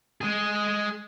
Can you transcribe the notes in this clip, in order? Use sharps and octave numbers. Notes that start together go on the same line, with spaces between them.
G#3 G#4